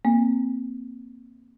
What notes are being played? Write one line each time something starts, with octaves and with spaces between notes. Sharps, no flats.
A#3 C4